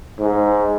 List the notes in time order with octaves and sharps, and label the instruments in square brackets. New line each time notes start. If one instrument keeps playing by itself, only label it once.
[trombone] G#2